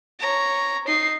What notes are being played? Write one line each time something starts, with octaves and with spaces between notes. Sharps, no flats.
C#5 A#5
D#4 C7